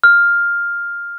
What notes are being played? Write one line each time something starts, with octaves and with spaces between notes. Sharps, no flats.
F6